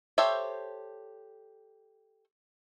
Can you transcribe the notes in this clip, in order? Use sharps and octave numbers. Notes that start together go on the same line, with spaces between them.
G4 A4 C5 C#5 E5